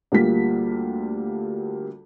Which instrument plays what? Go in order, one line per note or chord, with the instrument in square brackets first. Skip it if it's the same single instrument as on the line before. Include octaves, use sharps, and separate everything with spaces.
[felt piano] D2 G3 A#3 F4 B6